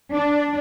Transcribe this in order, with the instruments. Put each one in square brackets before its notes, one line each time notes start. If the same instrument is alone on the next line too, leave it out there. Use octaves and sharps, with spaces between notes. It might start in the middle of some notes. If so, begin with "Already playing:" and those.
[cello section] D4